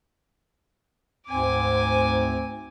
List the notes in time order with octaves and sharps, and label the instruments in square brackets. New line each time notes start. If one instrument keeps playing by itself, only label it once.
[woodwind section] D2 G#2 [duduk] C4 [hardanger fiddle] G#5 D6